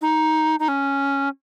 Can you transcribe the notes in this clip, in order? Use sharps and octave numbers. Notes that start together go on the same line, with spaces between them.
D#4
D#4
C#4